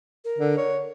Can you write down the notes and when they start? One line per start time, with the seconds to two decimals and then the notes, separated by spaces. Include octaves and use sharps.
0.25 A#4
0.38 D3
0.57 C#5